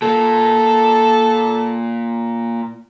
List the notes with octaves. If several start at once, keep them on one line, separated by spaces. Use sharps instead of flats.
A#2 A#3 A4